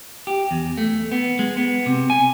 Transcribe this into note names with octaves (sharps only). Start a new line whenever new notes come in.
G4
E2
A3
B3
G#3
B3
C3
G#5